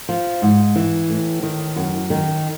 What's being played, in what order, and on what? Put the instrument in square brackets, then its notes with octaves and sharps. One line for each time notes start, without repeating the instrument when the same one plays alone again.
[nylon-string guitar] F3
G#2
E3
A2
D#3
F#2
D#3